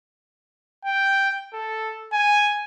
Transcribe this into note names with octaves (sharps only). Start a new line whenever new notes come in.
G5
A4
G#5